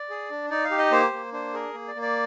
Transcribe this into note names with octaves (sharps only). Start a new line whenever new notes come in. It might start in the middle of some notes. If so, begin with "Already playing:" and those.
Already playing: D5
G#4
D4
D#4 D5
F5
G4
D#5
A#3 C5
A#3
D4 C5
G#4 A#4
A#3
D5
A#3
D5